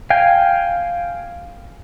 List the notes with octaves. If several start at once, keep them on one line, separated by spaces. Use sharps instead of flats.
F5 G5 G#5